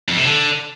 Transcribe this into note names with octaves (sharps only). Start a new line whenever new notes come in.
F2
C3
D3